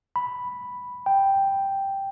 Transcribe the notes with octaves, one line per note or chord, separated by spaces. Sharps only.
B5
G5